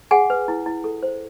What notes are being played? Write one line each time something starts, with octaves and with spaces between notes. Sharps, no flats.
G#4 F#5 G#5
B4
E4
E4
A4
C5